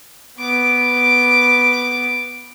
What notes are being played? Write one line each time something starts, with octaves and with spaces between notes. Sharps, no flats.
B3 D6